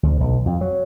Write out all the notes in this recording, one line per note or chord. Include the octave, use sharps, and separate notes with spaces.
D2
B1
F2
F#3